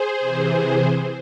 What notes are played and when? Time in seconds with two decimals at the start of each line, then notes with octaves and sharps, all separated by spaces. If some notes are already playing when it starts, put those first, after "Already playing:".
Already playing: G#4 C5
0.20 C3 E3